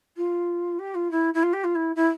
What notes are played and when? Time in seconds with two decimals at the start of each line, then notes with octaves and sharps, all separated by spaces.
0.17 F4
0.79 G4
0.95 F4
1.11 E4
1.34 E4
1.43 F4
1.53 G4
1.64 F4
1.75 E4
1.96 E4